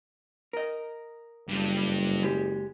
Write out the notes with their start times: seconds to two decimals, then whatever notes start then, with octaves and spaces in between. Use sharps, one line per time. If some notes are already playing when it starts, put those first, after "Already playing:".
0.53 A#4 D#5
1.49 F#1 G2
2.23 G#3 G4